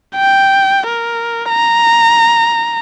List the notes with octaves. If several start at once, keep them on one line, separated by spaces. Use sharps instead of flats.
G5
A#4
A#5